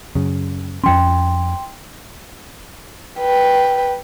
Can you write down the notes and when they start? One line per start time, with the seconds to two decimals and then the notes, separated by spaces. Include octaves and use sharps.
0.15 F#2 C#3
0.84 F2 F3 C#4 G5 C6
3.19 B4 G5